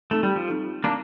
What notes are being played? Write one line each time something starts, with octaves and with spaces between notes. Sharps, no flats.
A3 C4 D#4 A4
G3
F3
C4 D#4 A4
A#3 C4 D4 D#4